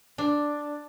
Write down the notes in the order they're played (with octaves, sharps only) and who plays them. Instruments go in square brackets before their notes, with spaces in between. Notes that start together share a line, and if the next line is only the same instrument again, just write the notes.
[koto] D4